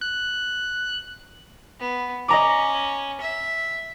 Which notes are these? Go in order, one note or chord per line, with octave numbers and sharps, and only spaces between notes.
F#6
B3
C#4 D#5 A#5 D6
E5